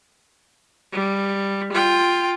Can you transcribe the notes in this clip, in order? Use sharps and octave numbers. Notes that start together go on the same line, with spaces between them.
G3
F4 G5